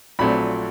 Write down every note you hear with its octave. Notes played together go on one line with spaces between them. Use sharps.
A#1 A#2 F#3 A3 C4 B5